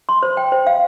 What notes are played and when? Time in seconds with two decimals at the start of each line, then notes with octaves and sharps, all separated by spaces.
0.09 C6
0.23 C5
0.37 G5
0.52 C5
0.67 F5